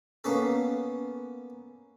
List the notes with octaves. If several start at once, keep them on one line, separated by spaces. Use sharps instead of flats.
A#3 B3 C#4 A4